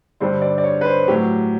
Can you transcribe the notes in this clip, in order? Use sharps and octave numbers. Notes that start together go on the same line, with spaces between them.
G2 D3 G3 C5
D5
D5
C#5
B4
C5
A2 F#3 G4